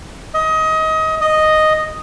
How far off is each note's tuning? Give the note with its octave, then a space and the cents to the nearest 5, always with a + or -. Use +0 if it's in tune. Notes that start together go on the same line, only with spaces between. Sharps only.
D#5 +25
D#5 +0